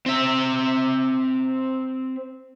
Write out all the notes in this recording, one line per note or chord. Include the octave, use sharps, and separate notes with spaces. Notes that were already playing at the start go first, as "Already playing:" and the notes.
C4 E5